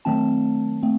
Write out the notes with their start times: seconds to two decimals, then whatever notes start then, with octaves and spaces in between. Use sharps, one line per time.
0.05 D#3 F#3 A3 C4 A5
0.83 A3 C4